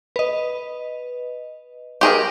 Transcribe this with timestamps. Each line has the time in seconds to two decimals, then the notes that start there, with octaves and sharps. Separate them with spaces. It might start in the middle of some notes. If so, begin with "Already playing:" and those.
0.16 B4 D#5
2.01 G4 G#4 A#4